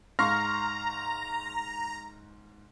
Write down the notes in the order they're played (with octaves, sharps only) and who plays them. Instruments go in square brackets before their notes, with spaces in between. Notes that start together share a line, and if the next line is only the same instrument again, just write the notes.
[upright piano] G#2 F5 C#6 [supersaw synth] A#5 [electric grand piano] C6 F6 A#6